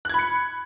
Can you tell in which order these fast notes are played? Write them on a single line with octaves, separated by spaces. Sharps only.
F#6 G#6 B5 C#7